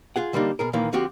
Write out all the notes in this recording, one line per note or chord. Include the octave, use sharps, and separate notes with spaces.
F4 G#4 F#5
D3 G3 A#3 D4 D#4
B2 G#4 A#4
A#2 D#3 E3 A#3
D3 F3 C4 F#4 G4